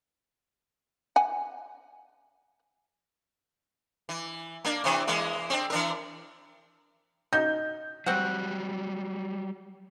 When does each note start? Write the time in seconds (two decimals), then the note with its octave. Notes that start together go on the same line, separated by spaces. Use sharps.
1.16 F#5 G#5
4.09 E3
4.65 A#3 D4
4.84 C3 E3 C4
5.07 E3 G#3 A#3
5.50 C4 D4
5.70 E3 D4 A#4
7.33 D#4 G6
8.06 F#3 G3 C4 F#4 F#5